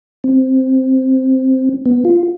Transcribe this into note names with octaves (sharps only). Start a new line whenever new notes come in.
C4
B3
F4